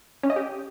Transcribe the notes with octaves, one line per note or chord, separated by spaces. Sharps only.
C#4
D#5
G4